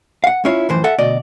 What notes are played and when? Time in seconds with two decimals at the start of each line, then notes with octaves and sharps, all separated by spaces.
0.24 F5 F#5
0.45 C#4 E4 F4 C#5
0.69 F#2 A2 E3 F3 C5
0.84 A4 E5 F#5
0.98 D2 B2 D5 D#5